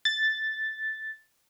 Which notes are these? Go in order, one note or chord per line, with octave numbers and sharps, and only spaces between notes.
A6